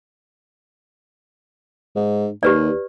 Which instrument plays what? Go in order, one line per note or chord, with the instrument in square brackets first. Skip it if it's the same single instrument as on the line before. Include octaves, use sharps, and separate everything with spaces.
[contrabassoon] G#2
[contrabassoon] D#2 [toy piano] G4 B4 D5